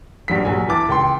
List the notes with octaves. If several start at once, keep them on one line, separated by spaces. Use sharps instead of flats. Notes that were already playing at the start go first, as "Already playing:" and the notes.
A#1 G2 F#3 B6
A#1 F#3 G#5
E3 A5 D6 A6
C#2 G5 C6